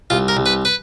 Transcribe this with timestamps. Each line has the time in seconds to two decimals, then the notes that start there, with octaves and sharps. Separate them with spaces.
0.10 C2 F4
0.28 A#4
0.37 C2
0.46 B4
0.65 B4